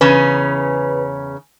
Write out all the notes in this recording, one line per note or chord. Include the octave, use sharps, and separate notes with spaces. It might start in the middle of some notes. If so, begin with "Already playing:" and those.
E2 C#3 C#4 B4